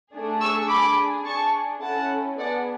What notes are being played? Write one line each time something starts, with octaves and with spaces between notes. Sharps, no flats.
A3 D4 G#4
C#6 E6
D4 G#4 B5 D6
D4 G#4 A5 C#6
C#4 E4 A4 F#5 A5
B3 D4 G#4 D5 F#5